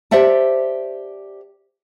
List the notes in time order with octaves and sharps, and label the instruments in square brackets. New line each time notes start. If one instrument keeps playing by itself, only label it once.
[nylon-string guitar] G4 C5 D5 E5 F#5 A5